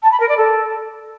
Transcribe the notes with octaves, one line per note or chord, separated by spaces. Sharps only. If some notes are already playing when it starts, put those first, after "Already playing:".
A5
B5
A#4
D5
A4